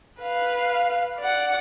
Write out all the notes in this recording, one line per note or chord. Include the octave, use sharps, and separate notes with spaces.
B4 F5
D5 F#5